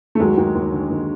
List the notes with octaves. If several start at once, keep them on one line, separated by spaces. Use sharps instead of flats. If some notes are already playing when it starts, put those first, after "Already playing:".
A3
D#2 F#3 G#3
D#2
D#2
D3
D#2